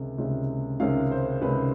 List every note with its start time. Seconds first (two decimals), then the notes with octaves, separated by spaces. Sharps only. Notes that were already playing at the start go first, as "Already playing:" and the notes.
Already playing: C#2 C3 D#3 G#3 C#4
0.18 C#2 C3 D#3 G#3 C#4
0.80 C#2 C3 D#3 G#3 C#4 F5
1.11 C5
1.41 C#2 C3 D#3 G#3 C#4 B4